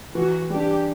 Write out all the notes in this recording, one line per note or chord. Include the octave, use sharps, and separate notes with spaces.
E3 F#4
G3 D4 G4